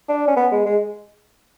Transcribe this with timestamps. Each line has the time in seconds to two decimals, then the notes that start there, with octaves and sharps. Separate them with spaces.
0.09 D4
0.28 C#4
0.36 B3
0.52 G#3
0.66 G#3